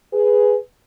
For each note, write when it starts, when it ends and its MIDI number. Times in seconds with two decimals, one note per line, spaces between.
0.13 0.57 68
0.13 0.57 71